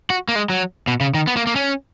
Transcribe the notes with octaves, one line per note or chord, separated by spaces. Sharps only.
F#4
A#3
G#3
F#3
B2
C#3
D#3
B3
A#3
A#3
C#4